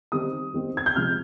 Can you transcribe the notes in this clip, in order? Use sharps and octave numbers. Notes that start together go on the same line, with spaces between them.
D#3 G3 C4 D#6
D#3 G3 C4
G#6
G6
C3 F3 G#3 F6